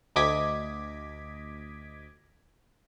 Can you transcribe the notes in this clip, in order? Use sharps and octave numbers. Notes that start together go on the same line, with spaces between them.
D2 D#5 D6 G#6 B6